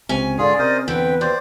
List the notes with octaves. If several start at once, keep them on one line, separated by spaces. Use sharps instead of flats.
C#2 C3 C#4 G#5
G#2 D3 F4 G#4 D5
C3 A#4 C5 D#5
E2 D3 C4 B4 G5
D#2 C5 D5